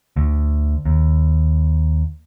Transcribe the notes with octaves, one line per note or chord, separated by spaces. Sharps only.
D2
D#2